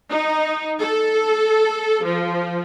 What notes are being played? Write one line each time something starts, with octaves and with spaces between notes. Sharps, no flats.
D#4
A4
F3